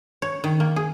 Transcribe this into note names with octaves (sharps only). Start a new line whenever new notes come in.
C#5
D#3
A#3
G#4